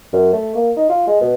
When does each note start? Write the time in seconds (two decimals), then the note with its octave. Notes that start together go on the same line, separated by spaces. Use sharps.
0.13 F#2
0.33 A3
0.55 A#3
0.77 D#4
0.89 F4
1.07 G#3
1.21 B2